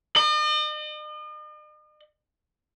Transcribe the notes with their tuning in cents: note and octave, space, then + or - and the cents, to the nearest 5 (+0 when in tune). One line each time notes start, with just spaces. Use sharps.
D#5 -45